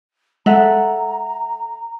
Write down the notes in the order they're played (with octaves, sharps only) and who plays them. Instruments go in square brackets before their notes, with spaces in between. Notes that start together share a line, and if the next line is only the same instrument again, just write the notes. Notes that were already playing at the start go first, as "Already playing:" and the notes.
[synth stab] G#3 [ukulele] A4 E5 F#5 [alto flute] A#5